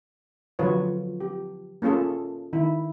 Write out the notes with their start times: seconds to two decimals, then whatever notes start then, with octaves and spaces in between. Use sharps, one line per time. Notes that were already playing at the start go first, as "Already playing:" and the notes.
0.59 D3 F3 F#3 F4 B4 C#5
1.21 G4
1.82 A#3 C#4 F4 G#4 A4
2.53 D#3 E4